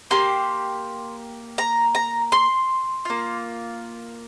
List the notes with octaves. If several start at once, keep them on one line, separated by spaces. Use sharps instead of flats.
A#3 G4 C6
A#5
A#5
C6
A#3 F4